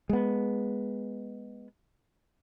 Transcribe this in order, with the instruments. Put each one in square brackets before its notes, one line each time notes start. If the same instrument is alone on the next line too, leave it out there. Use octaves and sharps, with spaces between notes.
[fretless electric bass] G#3 B3